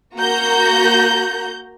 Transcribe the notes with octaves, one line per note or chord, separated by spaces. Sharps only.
A#3 F#4 A#5 G6